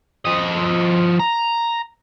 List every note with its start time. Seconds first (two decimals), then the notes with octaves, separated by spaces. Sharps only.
0.25 F3 D#5
1.19 A#5